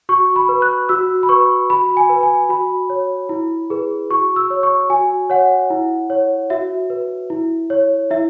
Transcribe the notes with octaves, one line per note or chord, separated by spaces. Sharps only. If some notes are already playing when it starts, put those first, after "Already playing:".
F#4 C#6
B5
B4
F#6
F#4 E6
B5
B4 C#6
F#4 B5
G#5
B4
G#5
F#4 B5
C#5
E4
G#4 B4
F#4 C#6
E6
C#5
C#6
F#4 G#5
C#5 F#5
E4
C#5
F#4 E5
B4
E4
C#5
E4 E5